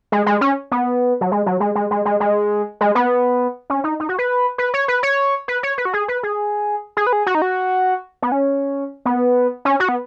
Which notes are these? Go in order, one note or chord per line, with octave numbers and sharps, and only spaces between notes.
G#3
G#3
C#4
B3
F#3
G#3
F#3
G#3
G#3
G#3
G#3
G#3
G#3
B3
C#4
D#4
D#4
F#4
B4
B4
C#5
B4
C#5
B4
C#5
B4
F#4
G#4
B4
G#4
G#4
B4
G#4
F#4
D#4
F#4
B3
C#4
B3
C#4
F#4
B3